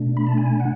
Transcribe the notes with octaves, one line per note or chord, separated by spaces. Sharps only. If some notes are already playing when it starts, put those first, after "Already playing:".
Already playing: B2 A3 D4
B5
A5
G#5
F#5